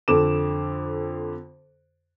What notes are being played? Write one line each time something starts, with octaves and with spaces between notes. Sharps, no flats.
F2 D3 A4 D6 E7